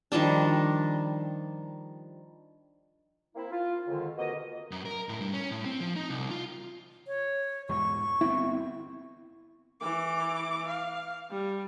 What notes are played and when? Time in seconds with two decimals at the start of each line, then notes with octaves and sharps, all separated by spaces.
0.12 D#3 F3 G3 D4
3.36 A#3 C4 E4
3.51 F4
3.88 F2 G#2 D3 D#3
4.17 F2 B2 A#3 F#4 D#5
4.71 F#2
4.86 A#4
5.09 A2
5.20 G2
5.34 C#4
5.51 A2
5.65 C4
5.80 F3
5.96 D#4
6.10 C2
6.31 F4
7.07 C#5
7.69 E2 G#2 B2 C#6
8.21 G1 B3 C4 E4
9.81 E3 D6
10.68 F5
11.30 G3